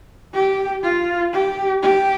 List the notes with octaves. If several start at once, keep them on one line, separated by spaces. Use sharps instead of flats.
G4
F4
G4
G4